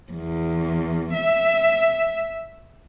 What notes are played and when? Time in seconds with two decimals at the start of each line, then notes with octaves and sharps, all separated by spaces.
0.12 E2
1.14 E5